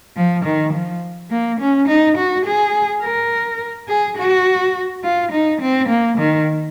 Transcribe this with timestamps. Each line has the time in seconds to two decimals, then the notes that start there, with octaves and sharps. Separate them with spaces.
0.16 F3
0.45 D#3
0.73 F3
1.31 A#3
1.60 C#4
1.88 D#4
2.17 F#4
2.45 G#4
3.02 A#4
3.88 G#4
4.18 F#4
5.04 F4
5.32 D#4
5.61 C4
5.89 A#3
6.18 D#3